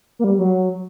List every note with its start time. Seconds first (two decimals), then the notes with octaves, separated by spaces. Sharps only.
0.19 A#3
0.24 G3
0.38 F#3